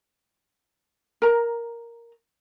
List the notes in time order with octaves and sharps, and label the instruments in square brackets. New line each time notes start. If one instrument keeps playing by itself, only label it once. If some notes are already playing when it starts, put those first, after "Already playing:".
[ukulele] A#4 A#5